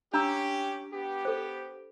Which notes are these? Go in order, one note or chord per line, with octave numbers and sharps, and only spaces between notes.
C#4 D4 G4 A#5 E6
B3 G4
A4 C5